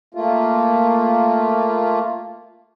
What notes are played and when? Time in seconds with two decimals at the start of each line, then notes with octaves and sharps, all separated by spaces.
0.14 A3 A#3 F4